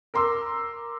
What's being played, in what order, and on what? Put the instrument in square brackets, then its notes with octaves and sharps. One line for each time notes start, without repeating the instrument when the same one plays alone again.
[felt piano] A#4 A#5 C6 D6 E6